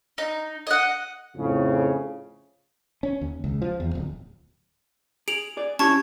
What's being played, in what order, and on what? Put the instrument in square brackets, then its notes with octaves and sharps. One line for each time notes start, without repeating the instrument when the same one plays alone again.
[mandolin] D#4
D#5 F#5
[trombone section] F2 A2 C#3
[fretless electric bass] C#4
D#2
C#2
F3
E2
D1
[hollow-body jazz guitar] G#4 [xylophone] D7 F7 F#7
[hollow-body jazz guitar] G#4 D5
[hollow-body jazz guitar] C#4 E4 G4 [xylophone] A5 C#6 G#6